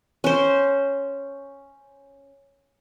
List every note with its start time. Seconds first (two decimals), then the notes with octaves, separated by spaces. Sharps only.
0.24 C#4 C5